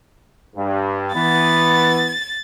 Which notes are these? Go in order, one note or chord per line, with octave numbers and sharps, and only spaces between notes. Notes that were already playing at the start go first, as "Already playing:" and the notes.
G2
E3 B3 A6